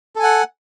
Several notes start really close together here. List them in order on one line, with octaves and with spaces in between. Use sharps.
A4 G#5 F#5